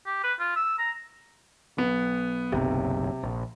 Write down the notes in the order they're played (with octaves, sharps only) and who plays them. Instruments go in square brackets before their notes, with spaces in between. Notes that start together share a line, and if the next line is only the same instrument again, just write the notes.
[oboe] G4
B4
F4
E6
A#5
[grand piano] B1 B3
[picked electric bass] F#1 B1 [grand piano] C3
[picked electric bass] A#1